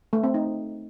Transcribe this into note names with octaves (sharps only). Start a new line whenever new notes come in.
A3
C4
D#4